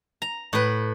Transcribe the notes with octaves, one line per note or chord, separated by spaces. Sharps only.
A#5
A2 B4